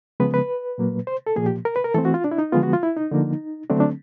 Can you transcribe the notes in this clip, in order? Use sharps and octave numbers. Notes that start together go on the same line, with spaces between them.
C#3 F3 G#3 B3 B4
B4
A#2 F#3 A#3
C5
A4
A#2 F3 A#3 G#4
G4
A#4
B4
A#4
E3 A3 C4 A4
F#4
F4
D4
E4
D#4
D3 F3 G#3 B3 F4
F#4
F4
E4
D#4
D3 F3 A#3
D3 F#3 A3 C4 D4
D4